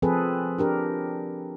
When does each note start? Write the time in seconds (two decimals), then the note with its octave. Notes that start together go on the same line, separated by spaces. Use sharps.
0.02 F3 C4 G#4 A4 B4
0.58 D4 G4 A#4